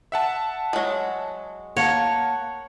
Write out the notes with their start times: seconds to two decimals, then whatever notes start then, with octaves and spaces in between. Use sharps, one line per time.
0.12 E5 F#5 A5
0.73 F#3 G#3
1.77 A#3 C#5 F#5 A5